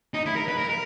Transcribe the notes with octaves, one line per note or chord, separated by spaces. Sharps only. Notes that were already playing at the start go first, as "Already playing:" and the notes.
D#4
E4
A#4
B4
A#4
A#4